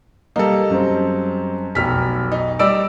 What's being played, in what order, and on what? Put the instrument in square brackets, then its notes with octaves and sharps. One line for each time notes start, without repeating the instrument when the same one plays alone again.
[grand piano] G3 A#3 [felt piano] D#4 A4
[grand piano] F#2 G3 C4
[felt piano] F1 F6 B6 [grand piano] B1
[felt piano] D#4
[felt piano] G3 D#4 D7 [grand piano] D5 E6